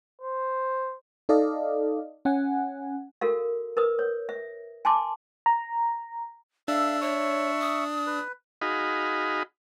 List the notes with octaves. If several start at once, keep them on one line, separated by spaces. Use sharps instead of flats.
C5
D#4 A4 D5 D#5 F5
C#4 F#5 G#5
F#4 A4 A#4 F5
A#4 B4 D#6
C#5
E5
G#5 A5 C6 D6
A#5
D4 A4 E5 F5
C#5 E5 C#6
D#6
B4
D#4 F#4 G#4 D#5 F5 B5